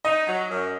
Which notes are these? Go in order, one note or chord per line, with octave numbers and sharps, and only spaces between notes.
D#4 D#5
F#3
F#2